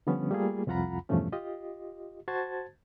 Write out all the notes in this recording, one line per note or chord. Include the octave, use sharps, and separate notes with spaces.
D3 F3 G3 B3 C#4
G3 A3 A#3 F4 G#4
C2 F2 F4 F#5 A#5 B5
E2 G2 B2 F3 A3 C#4
F4 G4 D#5
F#4 C5 A5 G#6 A6